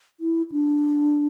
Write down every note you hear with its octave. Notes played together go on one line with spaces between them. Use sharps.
E4
D4